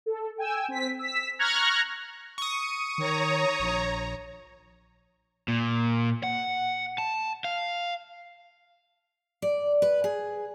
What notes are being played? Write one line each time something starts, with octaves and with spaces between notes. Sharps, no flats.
A4
G5 G#5 E6
C4 B6
E6 B6
A#5 C#6 F6 F#6 G#6 A#6
C#6 D#6
D#3 C#5 A#5
A#1
A#2
F#5
A5
F5
D5
B4
G#4